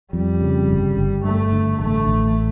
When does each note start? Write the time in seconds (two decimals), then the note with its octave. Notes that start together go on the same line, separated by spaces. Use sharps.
0.13 F2 G3
0.41 C#3
0.69 G1
0.97 G1
1.24 G2 A3
1.52 D3
1.80 A1 A3
2.07 A1